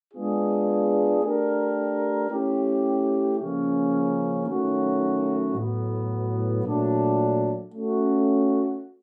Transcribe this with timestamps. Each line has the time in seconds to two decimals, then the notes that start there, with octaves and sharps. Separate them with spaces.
0.13 G#3 B3 D4 F4 G#4
1.22 A3 D4 G4 A#4
2.30 A3 C#4 E4 G4
3.38 C#3 F3 A#3 C#4
4.47 D#3 F#3 A3 C#4 F#4
5.55 A2 F#3 B3
6.64 A#2 F#3 A3 D4
7.72 A3 C#4 F#4